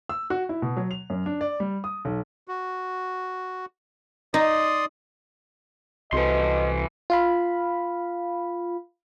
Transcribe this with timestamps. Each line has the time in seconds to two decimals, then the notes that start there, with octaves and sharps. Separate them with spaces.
0.09 E6
0.30 F#4
0.49 E4
0.62 B2
0.77 F#3
0.91 F7
1.10 F#2
1.26 D4
1.41 D5
1.60 G3
1.84 D#6
2.05 B1
2.48 F#4
4.34 D#4 D5 C6 D#6
6.13 C2 C3 E3 F#4 A4 B4 D#5 C6
7.10 F4 F5 B5